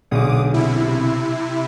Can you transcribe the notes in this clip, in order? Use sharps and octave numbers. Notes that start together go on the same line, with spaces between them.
B1 D3 G#4 D6 D#6
C3 E4